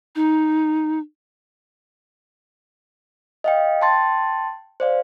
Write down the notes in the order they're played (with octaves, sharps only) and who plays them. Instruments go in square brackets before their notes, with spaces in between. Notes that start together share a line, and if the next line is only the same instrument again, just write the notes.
[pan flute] D#4
[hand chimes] D#5 F5 G5
G5 A5 C6 A6
C5 D5 F5